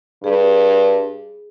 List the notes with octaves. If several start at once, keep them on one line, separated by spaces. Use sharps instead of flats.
G2 G#4